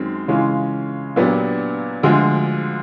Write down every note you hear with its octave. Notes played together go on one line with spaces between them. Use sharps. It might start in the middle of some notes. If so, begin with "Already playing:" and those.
Already playing: F#2 D#3 G#3 C4
C#3 E3 G#3 C#4 F4
A#2 F#3 B3 D4 G4
D2 D3 F3 G#3